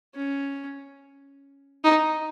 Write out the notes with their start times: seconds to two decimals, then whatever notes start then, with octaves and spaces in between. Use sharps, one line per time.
0.15 C#4
1.84 D#4